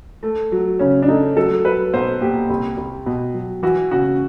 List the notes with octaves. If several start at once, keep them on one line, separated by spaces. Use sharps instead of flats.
A3
F#3
C#3 C#4
D4
A3 D#4
F#3 A4
F#3 B4
B1 C5
A#2 G4
C2
C2
B2
F#3
E3 F#4
C#3 F#4